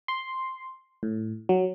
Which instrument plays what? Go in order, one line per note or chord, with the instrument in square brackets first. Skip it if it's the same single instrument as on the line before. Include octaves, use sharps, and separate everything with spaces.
[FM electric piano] C6
A2
F#3